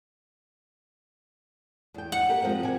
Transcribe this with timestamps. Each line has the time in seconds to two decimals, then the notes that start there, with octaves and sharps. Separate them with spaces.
1.94 E2 G5
2.12 F#5
2.29 A#3 G4 A#4
2.42 F3 G#3 C4
2.63 C3 G#5